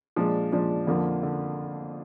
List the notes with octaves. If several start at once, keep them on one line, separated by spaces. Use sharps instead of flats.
A#2 F3 G#3 D4
A#2 F3 G#3 D4
F2 D3 F3 A#3
D3